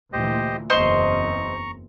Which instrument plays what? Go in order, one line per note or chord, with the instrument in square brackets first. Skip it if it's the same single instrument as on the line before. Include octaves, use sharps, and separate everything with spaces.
[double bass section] D2 A#2 E3 [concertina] G4 C5 D#5
[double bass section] F#1 E2 C4 [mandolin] C5 D#5 C6 [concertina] A#5 C#6